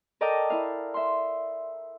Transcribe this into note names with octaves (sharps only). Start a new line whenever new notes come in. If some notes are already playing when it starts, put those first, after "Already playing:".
A4 A#4 D5 D#5 G5 A#5
E4 F5
E5 C6